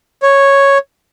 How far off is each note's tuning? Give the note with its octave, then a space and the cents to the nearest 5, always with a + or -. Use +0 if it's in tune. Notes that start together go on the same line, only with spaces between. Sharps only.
C#5 -5